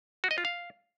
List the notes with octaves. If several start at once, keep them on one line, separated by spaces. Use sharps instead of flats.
F#4
D#5
F4
F5